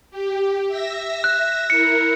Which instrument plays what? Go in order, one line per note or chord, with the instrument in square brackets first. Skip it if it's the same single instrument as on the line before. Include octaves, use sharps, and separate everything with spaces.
[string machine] G4
E5 E6 A#6
[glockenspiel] F#6
[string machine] E4 A#4 [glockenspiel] C#7